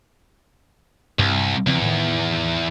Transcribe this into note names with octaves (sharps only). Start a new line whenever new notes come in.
C2 G2
E2 C#3 F3 C4
A2 D#3